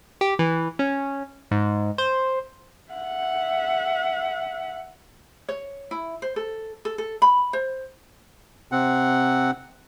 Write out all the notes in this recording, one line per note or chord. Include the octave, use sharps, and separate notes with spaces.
G4
E3
C#4
G#2
C5
E5 F#5
C#5
E4
C5
A4
A4
A4
B5
C5
C3 C4 F#5